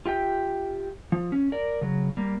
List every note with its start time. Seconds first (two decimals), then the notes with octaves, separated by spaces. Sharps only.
0.06 F4 G4 E5 G5
1.12 F3
1.32 C#4
1.52 A#4 D5
1.81 C#3 F#3
2.17 G3 A#3